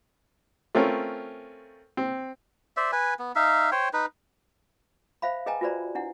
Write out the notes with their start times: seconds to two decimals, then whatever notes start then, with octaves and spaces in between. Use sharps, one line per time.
0.75 A3 C4 C#4 F4 A#4
1.97 C4
2.77 C5 D5 E5
2.92 B4 G#5
3.19 B3
3.35 D#4 E5 F5
3.72 C5 C#5 G5
3.93 D#4 B4
5.22 C5 E5 F5 B5
5.46 G#4 B4 D#5 G5 G#5 A#5
5.61 F4 F#4 B4 C5 D5 A#5
5.95 D4 E4 F#5